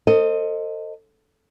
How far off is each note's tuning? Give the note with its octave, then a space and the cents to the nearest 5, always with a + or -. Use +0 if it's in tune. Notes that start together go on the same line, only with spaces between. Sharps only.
A4 +40 C5 +15 D#5 +0